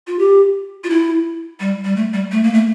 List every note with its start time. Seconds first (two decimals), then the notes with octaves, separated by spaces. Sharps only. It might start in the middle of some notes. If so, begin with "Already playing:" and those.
0.07 F4
0.19 G4
0.84 F4
0.90 E4
1.60 G3
1.85 G3
1.96 A3
2.14 G3
2.32 A3
2.43 A#3
2.53 A3